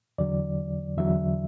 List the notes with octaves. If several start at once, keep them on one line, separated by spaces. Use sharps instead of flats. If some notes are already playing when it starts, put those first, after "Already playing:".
E2 D3 F#3 D5
E2 D3 F#3 E5